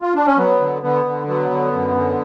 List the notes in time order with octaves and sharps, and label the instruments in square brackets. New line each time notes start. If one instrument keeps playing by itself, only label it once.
[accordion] F4
D4
C#4
F#3 B3
D3
D3 B3
D3
F#3 B3
D3
F#2
D3